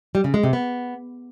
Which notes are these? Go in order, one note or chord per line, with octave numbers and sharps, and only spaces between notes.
G3
C#3
G#3
C3
B3